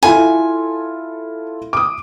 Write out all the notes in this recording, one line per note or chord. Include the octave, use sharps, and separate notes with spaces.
E4 F4 A4 G#5
D6 D#6